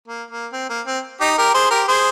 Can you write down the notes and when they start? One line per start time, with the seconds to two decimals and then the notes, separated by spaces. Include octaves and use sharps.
0.08 A#3
0.31 A#3
0.53 C4
0.69 A#3
0.87 C4
1.20 D#4 G4
1.38 G4 A#4
1.54 G#4 C5
1.70 G4 A#4
1.88 G#4 C5